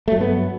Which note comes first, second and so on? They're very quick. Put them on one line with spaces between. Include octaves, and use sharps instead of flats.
A3 F#3 G2 B3